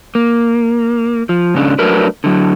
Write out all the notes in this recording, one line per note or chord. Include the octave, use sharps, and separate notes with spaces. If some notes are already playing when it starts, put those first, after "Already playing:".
A#3
F3
G#2 C#3 C#4 D4
F#3 A3 D4 A#4 B4
D3 F#3